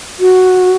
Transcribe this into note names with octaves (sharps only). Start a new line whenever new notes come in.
F#4